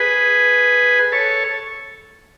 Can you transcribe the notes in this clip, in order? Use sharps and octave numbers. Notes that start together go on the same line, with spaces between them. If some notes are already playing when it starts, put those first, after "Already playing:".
Already playing: G#4 B4
A4 C#5